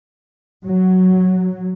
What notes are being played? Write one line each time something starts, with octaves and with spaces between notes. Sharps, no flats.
F#3